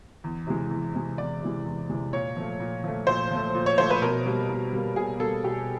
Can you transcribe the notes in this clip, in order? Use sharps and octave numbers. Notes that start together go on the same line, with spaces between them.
E2
C3 E3 G#3
E2
C3 E3 G#3
E2 D5
C3 E3 G#3
E2
C3 E3 G#3
A#2 C#5
F3 A3
A#2
F3 A3
A#2 C5
F3 A3
A#2
C#5
F3 A3 C5
B4
B2 A#4
G3 A#3
B2
G3 A#3
B2 G#4
G3 A#3 A4
B2 G4